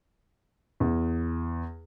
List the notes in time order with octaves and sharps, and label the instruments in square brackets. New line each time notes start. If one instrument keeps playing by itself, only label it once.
[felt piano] E2